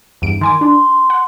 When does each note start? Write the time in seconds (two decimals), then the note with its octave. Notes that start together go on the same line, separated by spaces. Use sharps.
0.22 E2 G2 D7
0.41 D#3 G#5 C6 D6
0.61 D4 C6
1.10 F#5